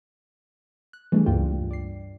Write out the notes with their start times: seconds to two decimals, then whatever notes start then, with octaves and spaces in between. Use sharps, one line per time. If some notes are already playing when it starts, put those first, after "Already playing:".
0.93 F#6
1.12 E3 G3 A3 D4 G#4
1.26 C#2 G2 A#3 D4 F4 G5
1.71 D5 C7